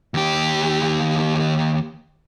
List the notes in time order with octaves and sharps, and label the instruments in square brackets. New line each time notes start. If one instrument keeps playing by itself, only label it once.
[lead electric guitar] D#2 G4